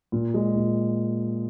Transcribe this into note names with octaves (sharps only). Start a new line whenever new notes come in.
A#2
G#3
A#2